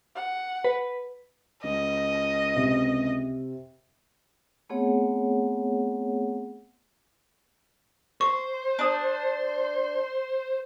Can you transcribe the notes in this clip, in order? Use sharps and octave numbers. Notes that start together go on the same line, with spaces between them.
F#5
B4
C#2 D#5
C3
A3 B3 C4 G#4 C#5 F#5
C5 C#6
D4 A5 D#6